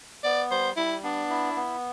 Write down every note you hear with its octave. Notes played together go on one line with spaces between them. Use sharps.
B3 D5
G3 C5
G3 E4
B3 D4
E4
B3